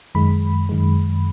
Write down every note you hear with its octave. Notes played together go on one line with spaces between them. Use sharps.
F#2 D#3 G#3 B5
F#2 D#3 G#3